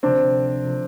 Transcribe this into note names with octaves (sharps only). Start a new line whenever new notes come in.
D2 C3 F3 A#3 C4 D4
C3 F3 A#3